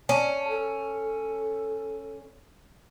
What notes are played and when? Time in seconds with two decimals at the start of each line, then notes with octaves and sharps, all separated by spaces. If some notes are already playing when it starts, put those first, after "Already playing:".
0.09 C#4 A5
0.49 A4